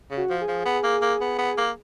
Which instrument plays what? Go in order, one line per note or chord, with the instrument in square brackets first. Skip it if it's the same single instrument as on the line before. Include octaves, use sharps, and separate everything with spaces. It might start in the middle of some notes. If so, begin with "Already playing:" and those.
[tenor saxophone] C#3
[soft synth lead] F#4
[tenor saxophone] F3
[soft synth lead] G#4
[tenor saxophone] F3
B3
A#3
A#3
B3
B3
A#3